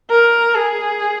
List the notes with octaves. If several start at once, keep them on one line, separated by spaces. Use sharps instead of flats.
A#4
G#4